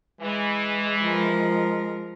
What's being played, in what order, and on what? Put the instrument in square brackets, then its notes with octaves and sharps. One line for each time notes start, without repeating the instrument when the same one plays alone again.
[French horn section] E3 [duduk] G#3
[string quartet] F3 A#4